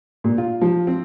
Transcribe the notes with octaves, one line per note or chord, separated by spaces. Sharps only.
A#2
F4
F3
C4